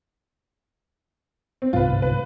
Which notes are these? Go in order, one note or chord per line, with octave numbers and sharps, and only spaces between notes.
C4
G1 C2 G#2 F4 B4
B4